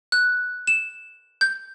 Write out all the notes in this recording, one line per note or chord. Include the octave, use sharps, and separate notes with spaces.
F#6
E7
G6